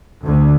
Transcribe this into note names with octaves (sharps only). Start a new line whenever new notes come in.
D2